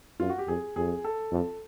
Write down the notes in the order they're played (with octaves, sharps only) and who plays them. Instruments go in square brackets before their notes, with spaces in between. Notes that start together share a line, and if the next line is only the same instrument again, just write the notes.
[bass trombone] F#2 [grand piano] F4
[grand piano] F#4
G4
[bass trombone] F2 [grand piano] G#4
[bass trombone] F2 [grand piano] G#4
[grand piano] A4
[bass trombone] F2